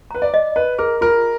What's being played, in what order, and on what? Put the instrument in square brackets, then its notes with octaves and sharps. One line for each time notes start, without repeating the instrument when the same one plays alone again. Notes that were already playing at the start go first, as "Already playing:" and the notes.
[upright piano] B4 [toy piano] A#5
[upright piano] D5
[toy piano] D#5
[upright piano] B4 [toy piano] D#5
[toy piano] G#4 [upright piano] A#4
[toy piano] F4 [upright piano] A#4